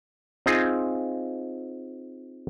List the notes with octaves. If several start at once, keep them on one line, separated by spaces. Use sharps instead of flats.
C4 D#4 F4 G#4